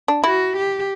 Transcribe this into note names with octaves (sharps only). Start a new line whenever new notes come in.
D4
E4 F#4
G4